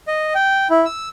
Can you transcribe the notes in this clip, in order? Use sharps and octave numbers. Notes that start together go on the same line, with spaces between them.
D#5
G5
E4
E6